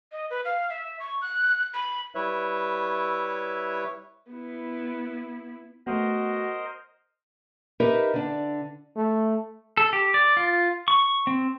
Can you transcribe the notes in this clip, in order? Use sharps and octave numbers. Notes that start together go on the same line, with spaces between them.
D#5
B4
F5
E5
C#6
F#6
B5
G3 E4 B4 C#5 E5
B3 E4
A3 B3 F#4 A#4 C5 D#5
D#4 G4 A#4 B4 D#5 E5
D3 D4
A3
A4
G4
D5
F4
C#6
C4